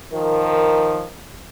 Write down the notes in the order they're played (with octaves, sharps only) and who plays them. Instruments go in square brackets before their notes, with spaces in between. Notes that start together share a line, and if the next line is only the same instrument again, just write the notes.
[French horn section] D#3 F3 A#4